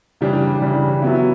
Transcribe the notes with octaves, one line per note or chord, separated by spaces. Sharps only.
C#3 E3 G3 D4
C#3 E3 G3 D4
F#3 B3 E4